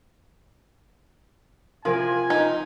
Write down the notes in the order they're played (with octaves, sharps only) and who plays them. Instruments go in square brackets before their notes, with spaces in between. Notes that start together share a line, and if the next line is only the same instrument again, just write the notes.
[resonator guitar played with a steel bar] C3 A#4 [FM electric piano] F3 F4 [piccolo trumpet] G#5
[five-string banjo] D#4